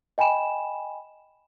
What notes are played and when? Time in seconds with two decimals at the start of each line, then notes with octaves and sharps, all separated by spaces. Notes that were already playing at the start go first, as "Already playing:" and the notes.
0.18 D#5 G5 G#5 B5 E7